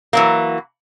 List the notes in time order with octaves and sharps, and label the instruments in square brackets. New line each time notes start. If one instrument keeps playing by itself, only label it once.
[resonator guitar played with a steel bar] E3 F#3 A#3